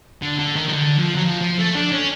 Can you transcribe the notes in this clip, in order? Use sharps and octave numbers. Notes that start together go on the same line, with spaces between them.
D3
D3
D#3
D#3
D3
F3
F#3
F3
F3
A3
D4
C#4